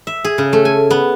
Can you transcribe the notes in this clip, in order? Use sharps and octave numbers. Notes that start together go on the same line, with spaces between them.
E5
G#4
C#3
A3
G#5
B3